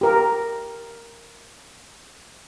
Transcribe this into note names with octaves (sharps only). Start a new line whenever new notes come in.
G4 A#4